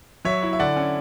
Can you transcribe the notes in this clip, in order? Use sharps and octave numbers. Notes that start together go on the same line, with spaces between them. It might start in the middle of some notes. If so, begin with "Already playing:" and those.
F#3 C#5 E5
E4
E5
D3 D5 F#5
C#4